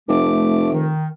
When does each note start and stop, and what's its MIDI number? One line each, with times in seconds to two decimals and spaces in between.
0.08 0.94 29
0.08 0.68 57
0.08 0.68 86
0.72 1.06 51